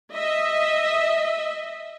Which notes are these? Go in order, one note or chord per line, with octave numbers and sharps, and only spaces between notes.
D#5 E5